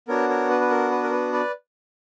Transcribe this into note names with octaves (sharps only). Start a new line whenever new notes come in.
B3 D4 F#4 A#4 C#5
A#4 C#5
B4
B4
A#4
B4
A#4
B4
B4 D5